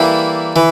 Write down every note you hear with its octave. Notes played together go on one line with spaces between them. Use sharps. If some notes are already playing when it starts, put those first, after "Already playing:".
Already playing: E3 G3 A#3 E4 A4
E3